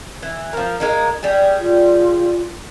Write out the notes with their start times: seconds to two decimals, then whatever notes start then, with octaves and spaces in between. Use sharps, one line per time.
0.23 E3
0.53 F3 A#4
0.80 G#3 A#3 D#4
1.23 G3 G#4
1.60 F4